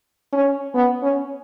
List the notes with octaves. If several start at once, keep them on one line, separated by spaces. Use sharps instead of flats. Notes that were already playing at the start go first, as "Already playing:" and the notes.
C#4
B3
C#4